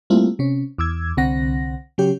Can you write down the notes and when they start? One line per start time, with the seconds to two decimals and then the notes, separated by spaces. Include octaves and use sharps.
0.10 G3 A3 A#3 C4 E4 F4
0.39 C3 C#4
0.78 E2 D6 E6 G#6
1.17 C2 D3 C4 F#5 A#6
1.98 C#3 F#3 C#4 G4 C#5